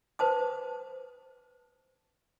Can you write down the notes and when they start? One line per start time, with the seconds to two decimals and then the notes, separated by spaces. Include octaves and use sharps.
0.19 B4 C5 A5 D#6